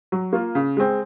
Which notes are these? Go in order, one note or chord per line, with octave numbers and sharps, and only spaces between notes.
F#3
A#3 F4
C#3
G#3 C4